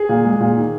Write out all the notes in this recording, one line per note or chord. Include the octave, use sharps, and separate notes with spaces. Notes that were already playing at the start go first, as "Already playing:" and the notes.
Already playing: G#4
A#2
G#3
A#2
D#3